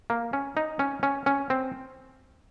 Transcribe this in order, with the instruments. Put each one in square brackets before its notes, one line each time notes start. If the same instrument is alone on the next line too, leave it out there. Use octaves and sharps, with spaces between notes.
[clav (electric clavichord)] A#3
C#4
D#4
C#4
C#4
C#4
C4